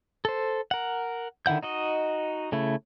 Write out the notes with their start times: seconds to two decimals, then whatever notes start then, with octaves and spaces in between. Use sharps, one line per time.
0.25 A4 C5
0.71 A#4 F#5
1.46 D3 D#3 E4 F#5 G6
1.63 D#4 F#4 D#5
2.52 C#3 A3 E4